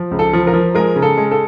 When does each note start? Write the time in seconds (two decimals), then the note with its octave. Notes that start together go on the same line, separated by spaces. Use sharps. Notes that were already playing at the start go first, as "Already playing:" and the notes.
Already playing: F3
0.11 C#2
0.19 A4
0.33 F3
0.47 A#4
0.54 F3
0.75 G#3 A#4
0.96 C#3
1.02 A4
1.18 G#3
1.31 A4